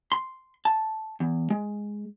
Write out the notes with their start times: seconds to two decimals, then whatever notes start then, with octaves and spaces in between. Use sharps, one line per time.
0.12 C6
0.65 A5
1.20 E2
1.50 G#3